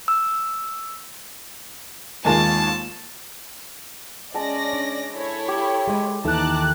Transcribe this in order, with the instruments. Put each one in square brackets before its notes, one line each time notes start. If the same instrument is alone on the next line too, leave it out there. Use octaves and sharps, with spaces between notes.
[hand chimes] E6
[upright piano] D#2 G#3 G#5 [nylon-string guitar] A#3 F4 [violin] A5
[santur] G#3 A5 [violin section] C#4 D5 A#6
[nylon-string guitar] D4
[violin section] E4 A4 C#5
[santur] G4
[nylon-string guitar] G#3 D#5
[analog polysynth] D#2 F#6 [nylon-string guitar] E3 D#4 A4 [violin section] A5 A#5 D6